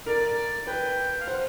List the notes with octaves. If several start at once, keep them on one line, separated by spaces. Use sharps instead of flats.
A#4 D5
B4 G5
F5
C5 F#5